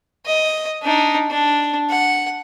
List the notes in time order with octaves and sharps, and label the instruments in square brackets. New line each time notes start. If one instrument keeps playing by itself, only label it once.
[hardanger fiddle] D#5
D4 D#4
D4
F#5